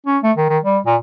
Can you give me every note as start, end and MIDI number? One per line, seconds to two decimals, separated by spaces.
0.06 0.18 61
0.23 0.32 57
0.37 0.48 51
0.49 0.58 51
0.64 0.78 55
0.86 0.96 46